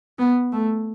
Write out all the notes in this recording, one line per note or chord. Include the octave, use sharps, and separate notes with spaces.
B3
A3